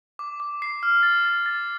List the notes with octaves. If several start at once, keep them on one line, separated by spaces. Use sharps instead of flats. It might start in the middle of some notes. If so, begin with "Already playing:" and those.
D6
D6
C7
F6
A6
A6
A6